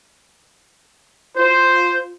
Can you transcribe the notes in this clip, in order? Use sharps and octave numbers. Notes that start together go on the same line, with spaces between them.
F4 C5